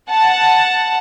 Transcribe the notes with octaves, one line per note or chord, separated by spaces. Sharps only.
F#5 A5